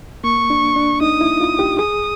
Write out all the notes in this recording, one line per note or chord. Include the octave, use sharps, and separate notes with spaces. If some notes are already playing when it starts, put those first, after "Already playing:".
A#3 C#6
D4
D4
D#4 D#6
E4
F4
G4
G#4 D#6